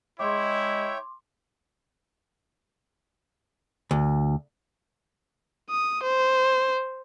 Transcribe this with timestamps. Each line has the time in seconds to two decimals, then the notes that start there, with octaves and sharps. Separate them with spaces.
0.19 G#3 E4 C#5 D#5 E5 G5 C6 D6
3.91 D2
5.71 D#6
6.03 C5